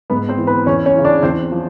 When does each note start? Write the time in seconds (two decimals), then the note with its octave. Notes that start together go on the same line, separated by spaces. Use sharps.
0.10 G#2 B3 B4
0.29 C4 C5
0.38 E3
0.47 B3 B4
0.66 E2 C#4 C#5
0.86 C#4 C#5
0.95 C#3 E3
1.05 D4 D5
1.22 E2 C4 C5
1.52 F3